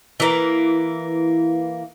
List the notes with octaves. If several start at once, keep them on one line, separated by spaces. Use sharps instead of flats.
E3 A#3